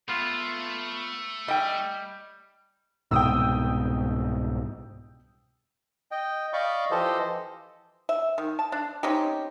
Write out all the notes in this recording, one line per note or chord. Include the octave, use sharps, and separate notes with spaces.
A3 B3 F4
G3 D#5 G5
C2 G#2 B2 G5 D#6 E6
D#5 G5
D5 D#5 F5 B5 C#6 D6
E3 F3 G4 A4 C5 D#5
E5
D#3
A5
D4
C4 C#4 D#4 G4